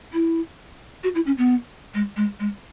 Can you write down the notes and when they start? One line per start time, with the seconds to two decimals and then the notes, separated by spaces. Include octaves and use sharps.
0.13 E4
1.03 F#4
1.15 E4
1.26 C#4
1.38 B3
1.94 G#3
2.16 G#3
2.39 G#3